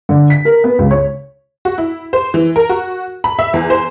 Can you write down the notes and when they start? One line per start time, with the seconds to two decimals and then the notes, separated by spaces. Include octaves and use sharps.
0.09 D3
0.30 B6
0.45 A#4
0.64 B3
0.79 C#2
0.91 C#5
1.65 F#4
1.78 E4
2.13 C5
2.34 E3
2.56 A#4
2.69 F#4
3.24 B5
3.39 E5
3.54 E2
3.70 C5